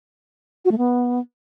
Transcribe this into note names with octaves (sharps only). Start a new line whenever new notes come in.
F#4
A3
B3